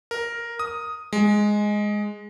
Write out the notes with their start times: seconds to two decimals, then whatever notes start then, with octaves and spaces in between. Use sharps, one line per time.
0.11 A#4
0.59 D#6
1.13 G#3